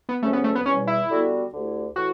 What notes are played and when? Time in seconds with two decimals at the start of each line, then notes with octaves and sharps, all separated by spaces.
0.09 B3
0.22 D2 C#3 F#3 A3 C#4
0.33 B3
0.44 A3
0.55 B3
0.65 E2 B2 G3 C#4
0.87 E4
1.09 D3 G3 B3 F#4 A4
1.52 D2 D3 A3 E4 G4
1.96 A2 E3 F#4